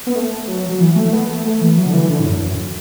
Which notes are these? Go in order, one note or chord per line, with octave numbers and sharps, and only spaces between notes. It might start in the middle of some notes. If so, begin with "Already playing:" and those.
B3
A3
F#3
F#3
E3
A3
B3
A3
A3
E3
F#3
D3
E3
D3
A2
F#2
F#2